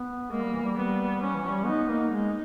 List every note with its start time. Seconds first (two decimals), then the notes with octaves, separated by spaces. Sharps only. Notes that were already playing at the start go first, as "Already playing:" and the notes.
Already playing: B3
0.31 G#3 A#3
0.42 G3
0.53 E3
0.64 G3
0.76 G3 B3
1.20 G3 C#4
1.34 E3
1.48 G3
1.65 B3 D#4
1.88 A#3
2.11 G#3 D#4